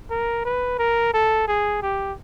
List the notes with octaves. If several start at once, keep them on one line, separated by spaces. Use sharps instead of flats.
A#4
B4
A#4
A4
G#4
G4